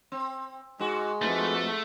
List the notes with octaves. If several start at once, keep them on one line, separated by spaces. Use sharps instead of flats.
C4
G#2 G#3 F#4
F2 G#2 A3 F#4 B4